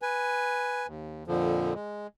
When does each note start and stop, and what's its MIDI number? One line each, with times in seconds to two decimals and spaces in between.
0.02 0.87 71
0.02 0.87 80
0.87 1.23 39
1.28 1.73 41
1.28 1.73 46
1.28 1.73 50
1.28 1.73 53
1.74 2.07 56